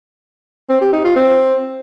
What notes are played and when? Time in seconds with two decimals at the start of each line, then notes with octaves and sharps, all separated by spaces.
0.70 C4
0.81 G4
0.93 D#4
1.04 F4
1.16 C4